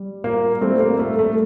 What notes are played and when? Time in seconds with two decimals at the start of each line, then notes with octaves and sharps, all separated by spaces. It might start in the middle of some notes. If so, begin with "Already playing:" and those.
Already playing: G3
0.24 A#2 A#3
0.61 G3 A3 C4
0.81 A#3
0.99 A#2 A3
1.19 A3